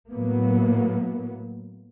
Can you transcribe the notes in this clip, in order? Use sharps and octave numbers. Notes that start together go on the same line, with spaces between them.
A2 F#3 A#3 B3